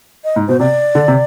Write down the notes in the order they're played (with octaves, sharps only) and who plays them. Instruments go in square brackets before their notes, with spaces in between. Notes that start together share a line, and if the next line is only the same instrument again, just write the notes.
[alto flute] D#5
[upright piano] G#2
[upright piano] B2 [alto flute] C5
[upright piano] C3 [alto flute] D5
[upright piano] D3
C3